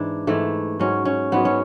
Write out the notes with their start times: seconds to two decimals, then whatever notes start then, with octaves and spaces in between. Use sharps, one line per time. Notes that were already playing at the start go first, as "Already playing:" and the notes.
Already playing: G#2 E3 D4
0.27 G#2 E3 A3
0.80 G#2 F#3 C#4
1.05 C#4
1.32 G#2 F#3 B3
1.45 C#4